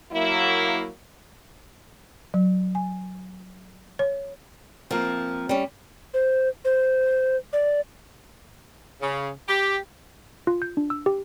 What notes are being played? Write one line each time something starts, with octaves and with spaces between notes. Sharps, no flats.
F#3 A#3 E4
F#3
G#5
C#5
F3 A#3 C4 A#4
G3 C#4
C5
C5
D5
C#3
G4
F4
G6
D4
E6
G4